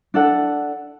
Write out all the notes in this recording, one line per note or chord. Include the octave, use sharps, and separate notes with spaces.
D4 A4 F#5